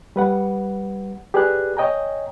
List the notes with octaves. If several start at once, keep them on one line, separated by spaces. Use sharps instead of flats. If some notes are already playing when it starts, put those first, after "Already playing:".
G3 B4 F#5
G4 G#4 B4 D5 G#5 F#6
C#5 D#5 G5 G#5 A#5